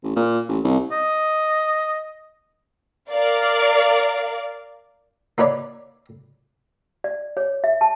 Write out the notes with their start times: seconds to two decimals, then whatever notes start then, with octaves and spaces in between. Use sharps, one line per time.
0.04 A1
0.16 A#2
0.49 A1
0.64 C2
0.91 D#5
3.11 A#4 D5 F5
5.38 A#3 D#4 B4 C#5 D5
7.04 D5
7.37 C#5
7.64 E5
7.81 A5